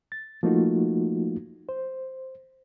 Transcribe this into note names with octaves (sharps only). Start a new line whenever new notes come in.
A6
F3 A3 A#3 D#4 F4 F#4
C5